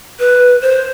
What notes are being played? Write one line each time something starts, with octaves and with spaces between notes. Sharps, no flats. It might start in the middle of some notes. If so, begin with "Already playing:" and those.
B4
C5